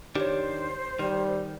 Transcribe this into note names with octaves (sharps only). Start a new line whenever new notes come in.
D#3 D4 G4 C5 C#5
D#3 G3